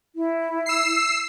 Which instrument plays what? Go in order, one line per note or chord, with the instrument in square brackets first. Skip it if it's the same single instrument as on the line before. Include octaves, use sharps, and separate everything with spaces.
[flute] E4
[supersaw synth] E6 C7